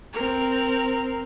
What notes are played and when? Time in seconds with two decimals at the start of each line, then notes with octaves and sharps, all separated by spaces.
0.13 C4 A#4